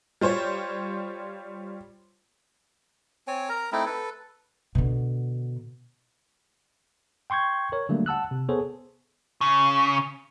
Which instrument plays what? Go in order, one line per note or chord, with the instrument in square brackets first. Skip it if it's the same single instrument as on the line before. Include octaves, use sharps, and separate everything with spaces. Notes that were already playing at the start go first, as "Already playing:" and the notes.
[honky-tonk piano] G3 F4 C5 C#5
[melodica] C4 C#5 G#5
A#4 A#5
A3 C4 D#4 E4
A4 B4
[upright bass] B2 D3
[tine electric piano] G5 C6 C#6 G6 G#6
A#4 C#5
D3 F#3 G3 A3 A#3
F#5 A5 E6 F#6
C3
B3 G#4 A4 C5 C#5
[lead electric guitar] C#3